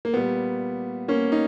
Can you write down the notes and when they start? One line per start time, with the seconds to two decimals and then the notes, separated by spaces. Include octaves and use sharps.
0.05 A#3
0.14 A#2 G3 B3
1.08 A#3 C#4
1.32 D#4